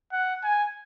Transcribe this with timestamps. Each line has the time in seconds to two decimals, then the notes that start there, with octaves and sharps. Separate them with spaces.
0.12 F#5
0.43 G#5